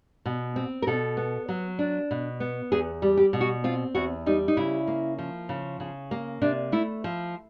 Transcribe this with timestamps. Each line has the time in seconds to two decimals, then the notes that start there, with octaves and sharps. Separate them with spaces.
0.26 B2
0.56 C4
0.82 A#4
0.87 B2 A4
1.17 B3
1.48 F#3
1.79 D4
2.11 B2
2.40 B3
2.72 E2 G#4
3.02 G3
3.17 G4
3.33 B2
3.41 F#4
3.64 C4 F4
3.95 E2 F#4
4.26 G3 D#4
4.48 D#4
4.57 C#3 E4
4.87 A#3
5.18 F3
5.49 C#3
5.80 C#3
6.11 A#3
6.41 C3 D4
6.72 A3 E4
7.04 F3